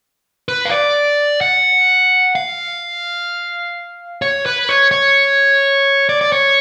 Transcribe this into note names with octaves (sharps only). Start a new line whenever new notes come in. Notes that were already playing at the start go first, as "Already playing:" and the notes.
B4
F5
D5
F#5
F5
C#5
B4
C#5
C#5
D5
D5
C#5